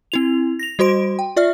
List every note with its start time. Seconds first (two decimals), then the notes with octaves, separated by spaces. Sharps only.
0.12 C4 E4 F7
0.59 A#6 F7
0.79 G3 F#4 C5 C6 D7
1.19 G5
1.36 F4 D5 E5 F6